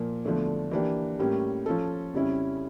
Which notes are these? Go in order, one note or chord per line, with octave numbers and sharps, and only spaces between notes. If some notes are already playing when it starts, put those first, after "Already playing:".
Already playing: A#2 F3 A#3
E2 D3 F3 A3 D4
E3 A#3 D4 G4
A2 G3 A#3 C#4 G4
F3 C#4 F4 A4
F2 C#3 G3 C#4 E4